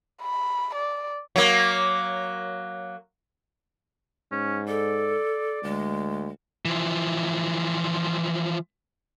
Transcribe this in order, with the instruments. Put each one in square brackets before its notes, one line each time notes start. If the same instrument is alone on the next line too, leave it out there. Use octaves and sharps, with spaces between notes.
[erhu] B5
D5
[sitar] F#3 A#3
[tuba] G#2 [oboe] C#4
[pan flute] A4 [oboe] D5
[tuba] D2 [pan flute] G#3
[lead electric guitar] E3 F3